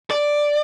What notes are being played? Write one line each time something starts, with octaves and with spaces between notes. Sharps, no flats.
D5